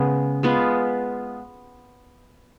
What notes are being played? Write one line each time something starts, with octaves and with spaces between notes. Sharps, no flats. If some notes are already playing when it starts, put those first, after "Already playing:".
Already playing: C#3 G#3 B3
G#3 B3 F4 B4